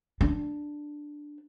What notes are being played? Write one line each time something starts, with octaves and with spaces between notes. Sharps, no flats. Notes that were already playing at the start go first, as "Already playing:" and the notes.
D4